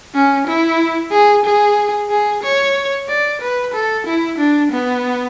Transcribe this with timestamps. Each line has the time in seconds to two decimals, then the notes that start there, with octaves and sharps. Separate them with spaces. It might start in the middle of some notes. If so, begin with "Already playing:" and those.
0.15 C#4
0.47 E4
1.12 G#4
1.45 G#4
2.10 G#4
2.43 C#5
3.08 D5
3.41 B4
3.74 A4
4.06 E4
4.38 D4
4.72 B3